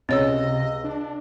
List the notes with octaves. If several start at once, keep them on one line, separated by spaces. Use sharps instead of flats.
C#2 C3 C4 C#5 D#5 E6
D4